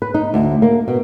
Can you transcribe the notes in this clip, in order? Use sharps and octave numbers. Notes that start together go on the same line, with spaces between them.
B4
D#4
D2
A#3
B2